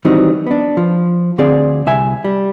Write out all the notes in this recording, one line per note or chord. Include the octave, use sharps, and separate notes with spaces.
D#3 E3 F#3 G3 C4 D#4
B3 D4
F3
D2 D3 C4 G#4 D5 F5
C2 E5 G#5
G3